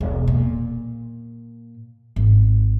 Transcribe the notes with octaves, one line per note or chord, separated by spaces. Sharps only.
E1
A#2
G#1